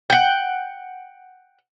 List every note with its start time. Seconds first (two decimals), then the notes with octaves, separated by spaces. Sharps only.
0.10 F#5 G5